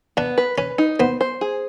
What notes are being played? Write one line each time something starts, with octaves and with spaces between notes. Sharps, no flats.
B3 D4
B4
C#4 B4
D#4
B3 C5
C5
G#4